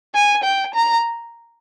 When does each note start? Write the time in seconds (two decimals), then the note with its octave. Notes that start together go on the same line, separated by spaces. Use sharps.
0.14 G#5
0.44 G5
0.75 A#5